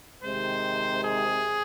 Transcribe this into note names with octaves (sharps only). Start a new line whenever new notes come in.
C3 D#3 G#3 C5
G#4